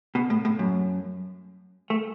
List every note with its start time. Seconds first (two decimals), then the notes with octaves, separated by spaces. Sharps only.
0.15 B2
0.30 A2
0.45 A2
0.59 F#2
1.90 A3